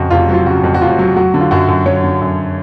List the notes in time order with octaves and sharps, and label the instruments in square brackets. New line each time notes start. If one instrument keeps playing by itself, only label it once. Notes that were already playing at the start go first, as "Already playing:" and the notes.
Already playing: [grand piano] F2 C#3 F#4
F1 F4
F#3
F4
C#3 F#4
F2
F#4
F1 F4
F#3
F#3 F#4
D3
F4
F#2 F#4
F#2
F#3 C#5
D3
F#2